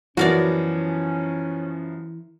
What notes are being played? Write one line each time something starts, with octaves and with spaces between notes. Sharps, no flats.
F#2 E3 F3 B3 C#4 F#4 A#4 D5